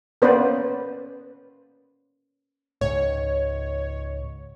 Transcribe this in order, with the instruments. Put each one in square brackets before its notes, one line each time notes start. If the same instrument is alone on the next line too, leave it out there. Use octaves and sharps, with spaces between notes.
[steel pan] A#3 B3 C#4 B4 C5 D5
[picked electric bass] C#2 G#2 [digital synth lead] C#5